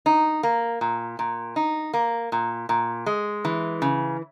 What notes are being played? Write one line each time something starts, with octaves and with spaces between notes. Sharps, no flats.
D#4
A#3
A#2
A#2
D#4
A#3
A#2
A#2
G#3
E3
C#3